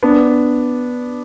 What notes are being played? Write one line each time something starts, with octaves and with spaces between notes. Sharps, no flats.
B3 D4